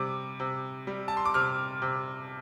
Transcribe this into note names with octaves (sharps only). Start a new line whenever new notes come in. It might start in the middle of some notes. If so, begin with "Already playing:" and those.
Already playing: C3 G3 D6
C3
G3
A5
C6
D6
C3 F6
C3